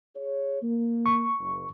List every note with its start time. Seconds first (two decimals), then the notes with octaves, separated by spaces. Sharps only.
0.16 G#4 C#5
0.62 A#3
1.06 C#6
1.39 F#1